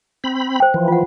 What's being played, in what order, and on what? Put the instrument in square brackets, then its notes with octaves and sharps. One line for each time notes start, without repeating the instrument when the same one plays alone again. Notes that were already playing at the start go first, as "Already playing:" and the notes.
[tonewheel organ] C4 B5
[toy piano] C5 G5
[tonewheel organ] E3 F3
[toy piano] F4 F#5